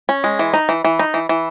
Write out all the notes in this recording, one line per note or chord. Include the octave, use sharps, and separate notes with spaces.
C#4
G#3
E3
D#4
E3
E3
D#4
E3
E3